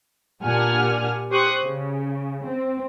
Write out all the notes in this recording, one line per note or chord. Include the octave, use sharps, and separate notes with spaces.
A#2 D4 G4 F#5 G#5 F6
G4 C5 C#6 D#6 F#6
C#3
C4